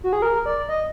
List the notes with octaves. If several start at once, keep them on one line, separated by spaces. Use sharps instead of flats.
F#4
G#4
A#4
D5
D#5